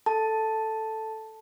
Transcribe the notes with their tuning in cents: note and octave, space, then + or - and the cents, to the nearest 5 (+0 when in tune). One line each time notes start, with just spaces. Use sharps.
A4 +0 A5 +0